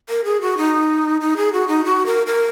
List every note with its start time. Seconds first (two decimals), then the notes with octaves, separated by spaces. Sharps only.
0.09 A#4
0.24 G#4
0.42 F#4
0.57 D#4
1.21 D#4
1.37 G#4
1.53 F#4
1.68 D#4
1.85 F#4
2.06 A#4
2.27 A#4